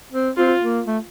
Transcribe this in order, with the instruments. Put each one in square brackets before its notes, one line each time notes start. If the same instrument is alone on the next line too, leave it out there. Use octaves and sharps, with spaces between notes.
[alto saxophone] C4
[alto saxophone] C4 [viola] F4
[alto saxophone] A#3
A3